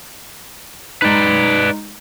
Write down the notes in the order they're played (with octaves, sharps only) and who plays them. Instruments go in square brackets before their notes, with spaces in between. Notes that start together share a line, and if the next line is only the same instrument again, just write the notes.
[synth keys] G#3 D#4 [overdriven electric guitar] B4 D5